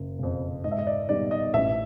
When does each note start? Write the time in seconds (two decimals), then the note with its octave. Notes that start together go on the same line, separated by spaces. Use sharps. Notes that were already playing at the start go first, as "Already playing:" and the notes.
Already playing: F#1
0.19 F2 C#3
0.64 G#2 D#5
0.71 E5
0.78 D#5
0.87 D5
1.09 D#3 G3 B3 D5
1.31 D#5
1.54 A1 E5